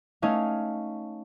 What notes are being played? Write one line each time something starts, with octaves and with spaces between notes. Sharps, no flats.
A3 C#4 D#4 C#5 F5